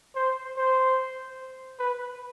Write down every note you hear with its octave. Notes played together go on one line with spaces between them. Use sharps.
C5
C5
B4